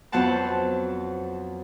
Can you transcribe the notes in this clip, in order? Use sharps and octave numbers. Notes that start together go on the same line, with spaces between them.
F2 F#3 B3 C5 F#5 A5